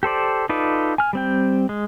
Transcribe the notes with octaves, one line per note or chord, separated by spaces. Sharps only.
G4 A4 C5 D5
D#4 F4 A4 B4 D5
G#5 F6
G3 C4 G5
G#3